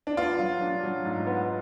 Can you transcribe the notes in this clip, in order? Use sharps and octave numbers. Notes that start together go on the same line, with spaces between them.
D4
B3 F4
F#3
D4
F#3
G#2
B3